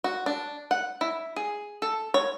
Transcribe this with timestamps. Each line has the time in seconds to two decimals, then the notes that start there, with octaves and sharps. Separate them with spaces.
0.04 F#4
0.26 D4
0.71 F#5
1.01 E4
1.36 G#4
1.82 A4
2.14 C#5